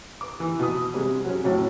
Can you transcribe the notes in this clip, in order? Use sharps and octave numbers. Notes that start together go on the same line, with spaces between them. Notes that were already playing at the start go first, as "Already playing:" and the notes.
D6
E3
B2 D#6
C3 G3 G#3
F#3 C#4
F2 A2 F#3